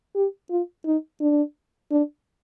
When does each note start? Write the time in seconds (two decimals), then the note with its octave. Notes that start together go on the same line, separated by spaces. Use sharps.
0.15 G4
0.50 F4
0.85 D#4
1.21 D4
1.91 D4